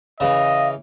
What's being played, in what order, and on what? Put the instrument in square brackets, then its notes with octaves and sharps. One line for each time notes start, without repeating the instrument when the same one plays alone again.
[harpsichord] C#3 E3 [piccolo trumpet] D#5 [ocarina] F5